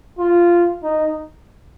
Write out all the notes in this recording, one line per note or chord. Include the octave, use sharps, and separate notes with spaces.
F4
D#4